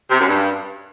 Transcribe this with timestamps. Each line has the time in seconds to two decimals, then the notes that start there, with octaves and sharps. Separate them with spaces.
0.10 C3
0.19 F#2
0.28 G2